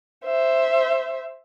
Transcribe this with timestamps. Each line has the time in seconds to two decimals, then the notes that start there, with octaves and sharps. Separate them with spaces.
0.25 C5 E5